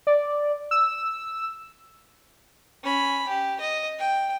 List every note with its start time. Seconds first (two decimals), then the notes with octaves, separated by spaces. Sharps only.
0.07 D5
0.71 E6
2.84 C#4 B5
3.28 G4
3.61 D#5
3.99 G5